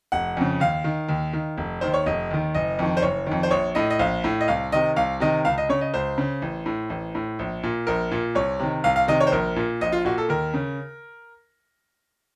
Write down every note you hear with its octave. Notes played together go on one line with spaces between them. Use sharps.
F1 F#5
F2 C#3
D#2 F5
D#3
D#2
D#3
F1
D#2 D#3 C5
C#5
F1 D#5
D#2 D#3
F#1 D#5
F2 D#3
C5
F#1 C#5
D#3
F2
C5
A#1 C#5
A2 D#5
D#5
A#1 F5
A2
D#5
C2 F5
C3 D#3 D#5
C2 F5
C3 D#3 D#5
C#2 F5
D#5
C#3 C#5
D#5
C#2 C5
C#3
A1
A2
A1
A2
A#1
A#2
A#1 A#4
A#2
C2 C#5
C3 D#3
C2 F5
F5
C3 D#3 D#5
C#5
C5
A#1 A#4
A#2
A#1 D#5
F4
A#2 F#4
A4
D#2 A#4
C#3